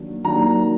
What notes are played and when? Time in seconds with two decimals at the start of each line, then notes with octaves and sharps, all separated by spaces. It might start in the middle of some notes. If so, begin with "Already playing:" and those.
Already playing: D#3 F#3 A#3 D4
0.24 D#3 F#3 A#3 D4 A#5